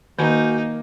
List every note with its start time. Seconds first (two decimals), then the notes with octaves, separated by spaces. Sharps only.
0.19 D#3 A#3 D#4 F#4 G#5 G6